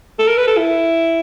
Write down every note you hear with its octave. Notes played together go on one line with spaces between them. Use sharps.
A4
A#4
B4
A4
E4